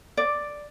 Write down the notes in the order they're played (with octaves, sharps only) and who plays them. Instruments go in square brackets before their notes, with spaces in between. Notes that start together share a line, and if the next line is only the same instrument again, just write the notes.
[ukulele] D5